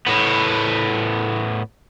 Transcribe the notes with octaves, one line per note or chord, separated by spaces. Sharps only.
A2 B3